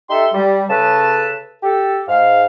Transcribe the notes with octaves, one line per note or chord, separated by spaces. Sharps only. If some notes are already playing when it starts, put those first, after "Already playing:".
D#4 G4 A4 E5 C6
G3
C#3 A4 B4 A5
G4 A4
G#2 F5